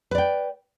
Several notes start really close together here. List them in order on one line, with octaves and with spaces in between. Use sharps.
B4 D5 G5